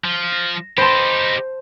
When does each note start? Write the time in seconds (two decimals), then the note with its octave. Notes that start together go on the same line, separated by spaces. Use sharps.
0.04 F3
0.32 A#6
0.78 D#4 G4 C5 A5 B5 C6